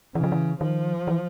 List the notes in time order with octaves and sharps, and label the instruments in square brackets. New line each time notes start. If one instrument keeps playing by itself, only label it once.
[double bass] C#3 [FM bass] E3
[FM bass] F3
E3
[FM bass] D#3 [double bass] F3
[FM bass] E3